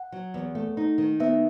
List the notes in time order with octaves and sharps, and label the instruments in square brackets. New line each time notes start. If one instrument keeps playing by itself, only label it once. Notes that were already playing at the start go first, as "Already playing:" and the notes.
Already playing: [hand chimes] F#5
[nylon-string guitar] F#3
E2
A3
D#4
D#3
[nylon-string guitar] B3 [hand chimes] E5